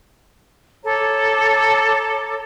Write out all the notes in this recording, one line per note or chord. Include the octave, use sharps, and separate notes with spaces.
A4 C#5 A#5 D6